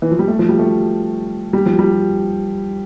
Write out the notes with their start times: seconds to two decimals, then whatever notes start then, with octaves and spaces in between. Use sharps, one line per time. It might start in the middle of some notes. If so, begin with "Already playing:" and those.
0.02 E3
0.12 F3
0.19 G3
0.28 A3
0.39 F3
0.49 G3
0.59 A3
1.53 G3
1.66 F3
1.79 G3